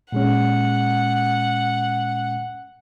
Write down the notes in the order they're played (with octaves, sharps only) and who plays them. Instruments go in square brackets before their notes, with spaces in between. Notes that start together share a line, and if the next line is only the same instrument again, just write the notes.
[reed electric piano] A#2 G#3 C#4 [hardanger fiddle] F#5